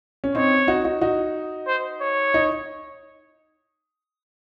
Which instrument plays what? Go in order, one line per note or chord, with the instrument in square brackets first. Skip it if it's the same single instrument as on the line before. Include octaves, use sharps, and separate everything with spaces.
[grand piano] C#4
[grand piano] C4 D#4 [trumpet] C#5
[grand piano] D#4 F#4
D#4 F#4
D#4 F#4
[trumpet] C5
C#5
[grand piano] D#4